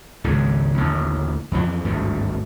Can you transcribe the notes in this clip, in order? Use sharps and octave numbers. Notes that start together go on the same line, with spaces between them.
G#1 C#2 G#2 C#3
A1 D#2 D3
F2 E3 F3
G#1 D2 G2 A3